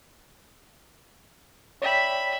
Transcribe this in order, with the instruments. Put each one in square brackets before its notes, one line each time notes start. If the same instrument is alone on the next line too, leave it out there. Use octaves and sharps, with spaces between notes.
[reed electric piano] C#5 D5 G5 [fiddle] E5 B5